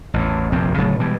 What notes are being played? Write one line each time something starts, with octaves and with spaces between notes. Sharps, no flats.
A1 E2
F1 A#1 G2 C4
D1 C#3 F#3 A3
B2 E3 G3 G#3